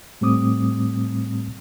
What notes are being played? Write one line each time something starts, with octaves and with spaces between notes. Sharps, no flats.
A2 G3 A3 C4 D6 D#6